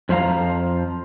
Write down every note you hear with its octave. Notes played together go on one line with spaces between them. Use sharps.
F2 F3 C4 F5 A#5